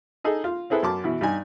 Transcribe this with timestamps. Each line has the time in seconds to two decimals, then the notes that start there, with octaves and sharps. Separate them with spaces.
0.24 D#4 G#4 A4 D#5
0.44 F4
0.70 C4 E4 G#4 A4 B4
0.83 F#2 A5 D6
1.04 B2 E3
1.21 G2 D#4 G#5